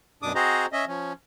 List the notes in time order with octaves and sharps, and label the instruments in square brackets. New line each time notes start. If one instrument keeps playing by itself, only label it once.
[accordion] F#2 B2 D4 D6 D#6
C4 F#4 G#4 C5 D#5 A#5
C#4 D#5 E5
F3 C#4